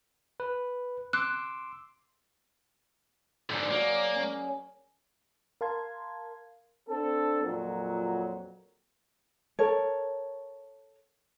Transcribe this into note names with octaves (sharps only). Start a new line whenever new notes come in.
B4
C6 D6 E6 F#6
G#2 D3 G#4 D5 A#5
F#3 A#3
C#4 A#4
A#4 F5 A5 C6 G#6
C4 D4 A4
F2 A#2 F#3
A4 A#4 C#5